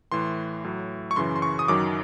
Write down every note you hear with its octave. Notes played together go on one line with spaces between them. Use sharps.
A2 E3 C6
A2 F#3
C#6
F#2 C#3 E3 C6
C6
C#6
D#6
F#2 D#3 F#3 D6